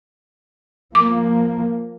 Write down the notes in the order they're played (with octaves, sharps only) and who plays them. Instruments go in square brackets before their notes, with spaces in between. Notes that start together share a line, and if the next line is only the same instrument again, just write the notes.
[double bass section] F3 A#3 [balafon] D6